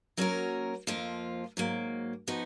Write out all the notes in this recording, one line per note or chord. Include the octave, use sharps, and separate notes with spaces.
F#3 A#3 C#4 F#4 A#4
F2 F3 A#3 F4
G#2 F#3 A#3
F3 B3 D#4 F#4